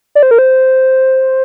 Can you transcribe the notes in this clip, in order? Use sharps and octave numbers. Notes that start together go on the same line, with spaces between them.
D5
C5
A#4
C5